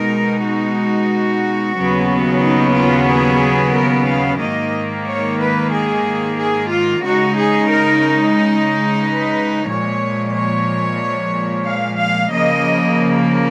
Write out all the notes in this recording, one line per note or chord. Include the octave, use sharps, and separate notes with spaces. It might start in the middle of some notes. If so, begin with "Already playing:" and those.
Already playing: B2 G#3 D#4 A#4
F#4
D#2 C#3 F#3 B3
D#4
F4
G#4
A#4
F5
G#2 D#3 A#3 D#5
C#5
B4
G#4
G#4
F4
C#3 G#3 D#4 F#4
G#4
A#4
B4
A#2 F3 G#3 C#5
C#5
F5
F5
C#3 F3 A#3 D#5